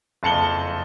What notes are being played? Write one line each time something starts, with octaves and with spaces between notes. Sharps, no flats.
F#1 F2 A5 C#7 F#7 G7